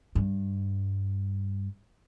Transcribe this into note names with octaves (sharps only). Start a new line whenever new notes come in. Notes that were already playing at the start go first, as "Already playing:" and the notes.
G2